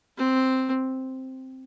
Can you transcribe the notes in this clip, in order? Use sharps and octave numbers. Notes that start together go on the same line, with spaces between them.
C4